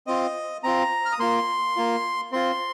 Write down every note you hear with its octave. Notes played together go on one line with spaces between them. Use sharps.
C4 F4 D#5
C4 F4 A#5
F6
D#6
A#3 F4 C6
A#3 F4
C4 F4 C6